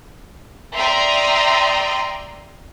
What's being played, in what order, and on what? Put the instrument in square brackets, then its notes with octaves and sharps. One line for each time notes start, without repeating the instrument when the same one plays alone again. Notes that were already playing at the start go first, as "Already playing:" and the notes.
[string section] D5 E5 G5 A#5 C6 D#6